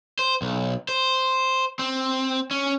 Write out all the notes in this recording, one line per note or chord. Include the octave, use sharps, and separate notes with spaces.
C5
B1
C5
C4
C#4